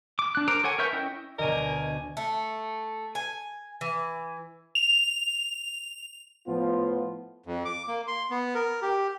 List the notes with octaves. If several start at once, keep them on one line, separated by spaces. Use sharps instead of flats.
D6
D4 F#6
A#4 C5 A#5 D6
A4 C#5 F#5 G#5
A#4 B4 E5 C#6 G6
C#4 E4 D#5 G5
D2 B2 A#4 D5 D#5 G#5 D#7
A3
G#5
E3
F7
A2 F3 B3 F4
F2
D6
A#3
C6
B3
A#4
G4